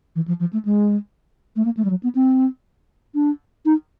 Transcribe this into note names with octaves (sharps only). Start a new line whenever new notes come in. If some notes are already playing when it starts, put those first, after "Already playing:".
E3
F3
F3
A3
G#3
A3
A#3
A3
G3
F#3
B3
C4
D4
D#4